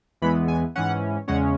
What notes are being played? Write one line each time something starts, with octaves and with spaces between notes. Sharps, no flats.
E2 E3 G#3 B3 B5
G#5
G#2 E3 C#4 F#5
E2 C#3 G#3 C#4 F#5